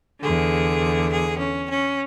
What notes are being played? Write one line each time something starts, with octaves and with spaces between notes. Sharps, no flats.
E2 D3 G#4
G#4
C#4
C#4